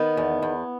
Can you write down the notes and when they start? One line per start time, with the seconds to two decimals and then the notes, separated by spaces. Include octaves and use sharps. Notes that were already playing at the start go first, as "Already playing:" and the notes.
Already playing: D#3 B3
0.17 E2
0.42 E2